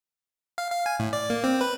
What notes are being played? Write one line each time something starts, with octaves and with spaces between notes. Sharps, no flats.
F5
F5
G#5
A2
D5
A#3
C4
B4